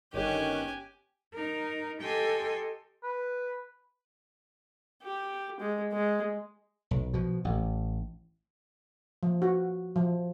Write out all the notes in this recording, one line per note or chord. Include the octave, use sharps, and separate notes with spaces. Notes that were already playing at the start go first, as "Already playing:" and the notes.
G1 D#3 C#4 G4 G#5 F#6
D#4 A#4
G4 A4 D#5 G5 G#5 C6
B4
G4
G#3
G#3
B1
B2 F3
A1
F3
F#4
F3